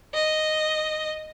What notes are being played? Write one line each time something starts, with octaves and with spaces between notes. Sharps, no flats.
D#5